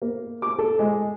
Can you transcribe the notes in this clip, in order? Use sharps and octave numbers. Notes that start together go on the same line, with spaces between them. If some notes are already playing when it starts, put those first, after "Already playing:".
A#3
D6
A4
G#3